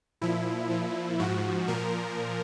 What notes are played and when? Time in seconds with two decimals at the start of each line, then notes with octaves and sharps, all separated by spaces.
0.21 A#2 F3 E4
0.70 A#2 F3
1.19 G#2 F3 F#4
1.68 A#2 F3 A#4